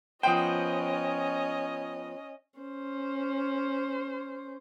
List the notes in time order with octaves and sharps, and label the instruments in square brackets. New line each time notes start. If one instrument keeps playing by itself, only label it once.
[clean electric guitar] F3 B3 C5 [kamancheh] C#4 D#5 [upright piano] G5 D#6
[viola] C#4 C5